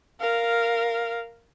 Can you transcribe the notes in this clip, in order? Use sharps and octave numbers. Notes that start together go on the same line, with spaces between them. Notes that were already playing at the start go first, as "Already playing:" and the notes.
A#4 F5